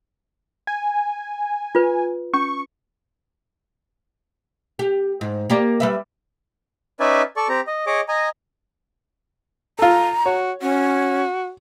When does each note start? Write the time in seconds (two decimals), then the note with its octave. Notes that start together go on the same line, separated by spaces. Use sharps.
0.67 G#5
1.75 F4 B4
2.34 C#4 C#6
4.79 G4
5.21 G#2
5.50 A#3 G4 D5
5.80 G3 B4 E5
7.00 C#4 D#4 B4 D5 E5 G#5
7.37 A4 D5 C#6
7.49 C4 G4 A#5
7.67 D#5
7.86 G#4 C#5 D#5 D6
8.08 D#5 G#5 A#5
9.79 F4 A4 A#5
10.26 F#4 C#5
10.62 C#4 F#4